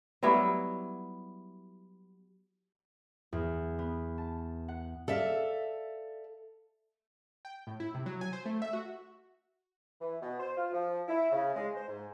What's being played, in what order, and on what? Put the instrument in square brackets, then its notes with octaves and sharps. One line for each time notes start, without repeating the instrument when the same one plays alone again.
[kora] F#3 G3 B3 E4
[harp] E2
B3
A5
F#5
[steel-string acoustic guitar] A4 D5 E5 F5
[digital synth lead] G5
A2
E4
C3
F#3
G#5
C5
A3
E5
F#4
[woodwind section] E3
B2
C5
F4
F3
E4
C#3
G#3
C5
G#2